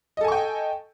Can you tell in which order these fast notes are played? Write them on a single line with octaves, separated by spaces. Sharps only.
D#5 A4 G#5 C#6 G5